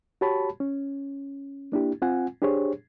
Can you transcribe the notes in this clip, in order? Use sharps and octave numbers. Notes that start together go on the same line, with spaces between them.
F#4 G4 C#5 A5 B5
C#4
A#3 D4 E4 G4
C4 F4 F#5 G#5
D4 G4 G#4 C5 C#5